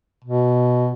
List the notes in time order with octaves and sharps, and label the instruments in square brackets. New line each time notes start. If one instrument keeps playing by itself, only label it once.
[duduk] B2